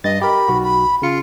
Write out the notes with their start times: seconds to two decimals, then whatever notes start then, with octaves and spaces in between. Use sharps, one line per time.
0.04 G2 D#5 A6
0.22 G4 A#4 B5
0.48 B1 F#4
0.63 B5
1.02 C#3 F4 C#7